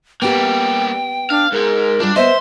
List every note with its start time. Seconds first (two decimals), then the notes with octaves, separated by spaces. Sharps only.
0.22 G3 A#3 B3 G4 G5
1.30 D4 F5
1.52 G#2 G#3 A#4
2.00 G3 D4 F4
2.16 B3 C5 D#5 E5 C6